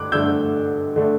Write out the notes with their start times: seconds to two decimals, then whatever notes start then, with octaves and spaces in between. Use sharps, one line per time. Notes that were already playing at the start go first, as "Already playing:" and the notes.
Already playing: G2 D3 D6 F#6
0.12 G2 D3 A3 E6 G6
0.96 D3 A3